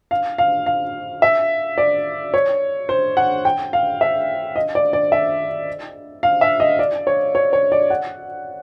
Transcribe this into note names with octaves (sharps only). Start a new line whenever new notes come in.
F5
F5
F5
E5
D5
C#5
C5
F#5
G5
F5
E5
D#5
D5
D5
E5
F5
E5
D#5
D5
C#5
C#5
C#5
D5
F#5